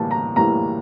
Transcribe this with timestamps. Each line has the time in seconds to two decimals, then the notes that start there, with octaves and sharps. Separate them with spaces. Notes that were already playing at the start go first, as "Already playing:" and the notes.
Already playing: A2 E3 G3 A#3 A5
0.11 A#5
0.36 A2 E3 G3 A#3 A#5